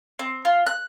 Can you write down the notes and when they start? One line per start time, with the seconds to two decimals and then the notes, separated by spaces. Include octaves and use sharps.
0.19 C4
0.45 F4
0.66 F#6